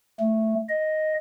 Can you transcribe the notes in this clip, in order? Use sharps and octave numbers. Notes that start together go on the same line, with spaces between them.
A3
D#5